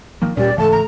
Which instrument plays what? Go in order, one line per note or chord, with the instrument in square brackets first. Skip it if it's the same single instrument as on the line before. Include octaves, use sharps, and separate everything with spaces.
[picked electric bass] D#3 F3 A#3
[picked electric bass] D#1 A#2 C#4 [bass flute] G3 [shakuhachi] D5
[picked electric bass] G#2 C#3 E3 [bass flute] A3 [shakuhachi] A5
[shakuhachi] A#5